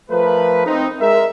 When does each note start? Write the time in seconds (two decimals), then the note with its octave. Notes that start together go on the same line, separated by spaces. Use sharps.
0.10 F3 A3 A#4 B4
0.66 C4 D#4
1.00 G#3 A#4 E5